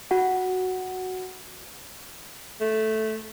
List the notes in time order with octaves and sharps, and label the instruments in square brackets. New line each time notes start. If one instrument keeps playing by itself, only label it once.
[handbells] F#4 F#5
[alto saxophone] A3